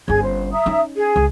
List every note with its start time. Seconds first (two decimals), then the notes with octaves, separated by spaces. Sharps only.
0.08 G1 C#4 G#4 G#5 G#6
0.23 C5
0.52 E5 A#5 D#6
0.66 C#4 D#4
0.96 G#4
1.16 C#2